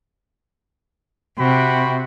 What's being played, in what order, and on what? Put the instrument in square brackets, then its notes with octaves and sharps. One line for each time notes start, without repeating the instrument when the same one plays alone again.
[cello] C3 [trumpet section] F#4 G5 B5